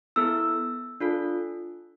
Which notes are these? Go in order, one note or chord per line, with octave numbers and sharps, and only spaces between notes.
B3 E4 A4 E6
D4 F4 A4